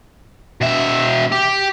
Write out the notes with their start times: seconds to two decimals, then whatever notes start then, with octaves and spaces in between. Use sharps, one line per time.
0.61 B2 E5
1.32 G4